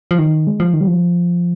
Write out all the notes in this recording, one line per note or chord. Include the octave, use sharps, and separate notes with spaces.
F3
D#3
G#3
F3
D#3
G3
F3